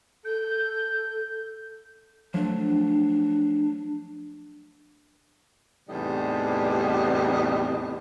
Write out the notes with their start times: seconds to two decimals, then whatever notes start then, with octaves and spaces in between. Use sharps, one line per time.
0.25 A4 G6
2.34 F3 F#3 A3 D4
5.89 E2 A2 C3 G3 B3 D#4